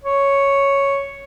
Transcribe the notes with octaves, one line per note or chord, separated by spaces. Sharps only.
C#5